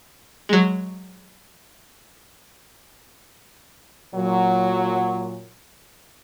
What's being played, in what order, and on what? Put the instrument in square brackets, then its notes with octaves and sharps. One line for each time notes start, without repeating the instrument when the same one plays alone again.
[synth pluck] F#3 G#3
[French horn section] A#2 F#3